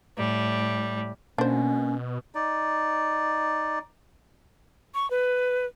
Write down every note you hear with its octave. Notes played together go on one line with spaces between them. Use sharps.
A2 G3
B2 A#3 C#4 D4 C5
D#4 D5
C#6
B4